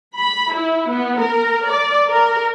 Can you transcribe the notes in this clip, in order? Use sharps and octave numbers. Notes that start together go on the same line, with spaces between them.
B5
E4
B3
A#4
D5
A#4